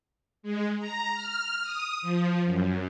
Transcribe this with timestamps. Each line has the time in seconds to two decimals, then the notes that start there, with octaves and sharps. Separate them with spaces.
0.43 G#3
0.79 A#5
1.15 F6
1.62 D#6
2.02 F3
2.45 F#2